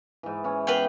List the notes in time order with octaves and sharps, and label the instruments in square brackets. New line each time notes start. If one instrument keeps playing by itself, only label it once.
[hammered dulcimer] G#2 E3
E3 C#4
[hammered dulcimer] B3 C#4 [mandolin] B4 F5 G5